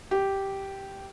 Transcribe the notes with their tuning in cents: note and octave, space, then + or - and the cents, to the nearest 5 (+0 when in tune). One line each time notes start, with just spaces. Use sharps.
G4 -5